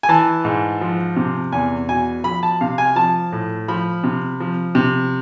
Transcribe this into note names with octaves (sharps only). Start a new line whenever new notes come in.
G#5
E3 A5
G#2
F3
C3
E2 G#5
B2 G#5
F3 B5
A5
C3 F5
G#5
F3 A5
A2
F3 B5
C3
F3
C3